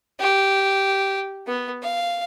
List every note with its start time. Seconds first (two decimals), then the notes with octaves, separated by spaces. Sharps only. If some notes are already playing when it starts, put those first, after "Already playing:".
0.20 G4
1.47 B3
1.83 F5